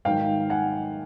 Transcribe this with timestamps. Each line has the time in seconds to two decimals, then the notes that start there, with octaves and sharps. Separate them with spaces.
0.05 G#2 D#3 F#3 F5 G5
0.50 F#5 G#5